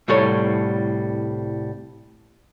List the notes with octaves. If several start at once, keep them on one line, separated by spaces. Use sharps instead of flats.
C2 A2 G3 A4 C#5